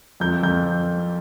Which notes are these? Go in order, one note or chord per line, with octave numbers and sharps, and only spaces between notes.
F2 G6
F2 G6